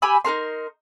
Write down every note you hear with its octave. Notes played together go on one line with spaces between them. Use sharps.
G4 G#5 B5 E6
D#4 F#4 A#4 C6